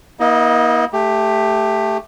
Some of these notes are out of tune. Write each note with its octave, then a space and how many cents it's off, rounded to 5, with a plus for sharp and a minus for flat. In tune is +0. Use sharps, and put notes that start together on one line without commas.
A#3 +45 E4 -40 D#5 +0
A3 +0 G4 +15